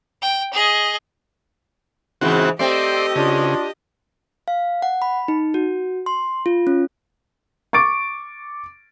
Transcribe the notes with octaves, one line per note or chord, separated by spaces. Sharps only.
G5
G#4 D#5
G#2 C#3 E3 C4 F#4
A3 C4 G4 D5 D#5 C6
C#3 D4 F4
F5
F#5
B5
D#4
F#4
C6
F4
C#4
C#6 D6 A6 D7